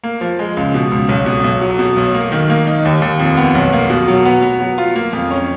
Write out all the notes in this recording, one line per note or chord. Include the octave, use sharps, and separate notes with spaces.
A#3
F3
G#3
C#2
B2
C#2
B1
B2
B1
F#3
B2
B1
A#3
D#3
A#3
D#4
D#2
D#2
F2
B3
B1
A#3
B2
F#3
B3
B3
F#3
F4
A#3
F2
C#4